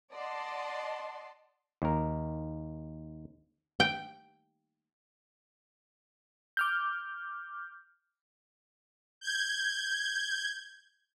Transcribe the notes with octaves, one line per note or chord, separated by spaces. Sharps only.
D5 D#5 F#5 A5 C6
D#2 A#4
G5
D6 F6 G6
G6 G#6